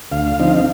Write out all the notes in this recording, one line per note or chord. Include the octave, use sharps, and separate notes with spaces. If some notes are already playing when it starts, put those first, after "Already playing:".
D2 F5
D3 F3 C4 D#4